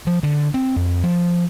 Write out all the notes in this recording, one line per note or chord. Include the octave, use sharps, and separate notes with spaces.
F3
D3
C4
F2
F3